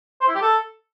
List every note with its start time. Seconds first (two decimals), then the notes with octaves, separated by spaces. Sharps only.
0.21 C5
0.28 E4
0.35 G4
0.42 A4